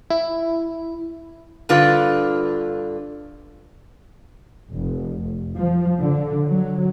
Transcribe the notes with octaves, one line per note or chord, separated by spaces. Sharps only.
E4
G2 D3 F4 B4
F1
F3
D3
F#3